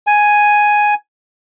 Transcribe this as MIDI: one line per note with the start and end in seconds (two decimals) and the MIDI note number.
0.07 0.94 80